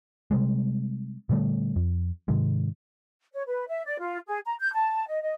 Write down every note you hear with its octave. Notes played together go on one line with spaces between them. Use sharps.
C3 G3 G#3
A#2 D3 G3 A3
F2
G#2 C3 D#3 G#3
C#5
B4
E5
D5
F4
G#4
A#5
G6
A5
D#5
D#5